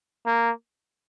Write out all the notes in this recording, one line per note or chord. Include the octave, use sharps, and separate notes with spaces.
A#3